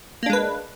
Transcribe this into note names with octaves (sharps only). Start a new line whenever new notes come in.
G#3 A#3 D4 B4